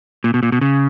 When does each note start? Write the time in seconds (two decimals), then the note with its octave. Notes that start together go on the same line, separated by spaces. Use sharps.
0.24 A#2
0.34 B2
0.43 A#2
0.52 B2
0.61 C#3